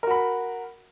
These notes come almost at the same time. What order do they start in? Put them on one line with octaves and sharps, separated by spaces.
A#4 F#4 B5